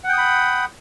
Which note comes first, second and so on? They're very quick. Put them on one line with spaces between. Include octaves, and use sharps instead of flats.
F#5 G5 D#6 B5